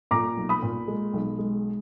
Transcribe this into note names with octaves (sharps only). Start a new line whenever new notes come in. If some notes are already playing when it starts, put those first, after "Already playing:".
A#2 A#5 D6
B1
B5 D#6
A#2
G#3
B1
G#3